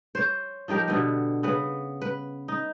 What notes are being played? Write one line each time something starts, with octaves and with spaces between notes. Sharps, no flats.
C5 C#5
F3 D#4 G4 A#4
B2 D3 B3
C#3 B3 B4
B4
D#4